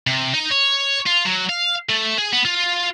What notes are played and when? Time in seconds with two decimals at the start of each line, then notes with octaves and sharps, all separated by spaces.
0.07 C3
0.34 D#4
0.51 C#5
1.06 F4
1.25 F#3
1.49 F5
1.89 A3
2.18 G#4
2.33 B3
2.45 F4